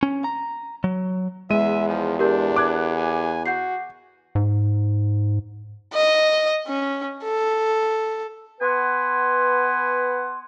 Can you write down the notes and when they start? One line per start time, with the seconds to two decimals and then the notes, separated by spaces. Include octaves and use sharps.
0.03 C#4
0.24 A#5
0.84 F#3
1.50 E2 G#3 E5 D#7
1.89 F3
2.19 D4 G4 A#4 G6
2.56 D6 F#6 G#6
2.97 G#5
3.46 F#4 F#5 G6 C7
4.35 G#2
5.93 D#5
6.67 C#4
7.23 A4
8.61 B3 B4 F#5 G#5 C6